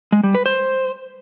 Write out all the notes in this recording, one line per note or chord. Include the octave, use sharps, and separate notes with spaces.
G#3
G3
B4
C5